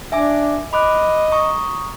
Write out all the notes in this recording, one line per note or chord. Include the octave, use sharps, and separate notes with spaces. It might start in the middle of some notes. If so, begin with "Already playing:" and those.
D4 E5 G#5 D6
D#5 B5 D6 F#6
A#5 C#6 D#6